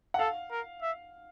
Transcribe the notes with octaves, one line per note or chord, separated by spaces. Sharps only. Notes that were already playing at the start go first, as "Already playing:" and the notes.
F#5
A4 F5
A#4
E5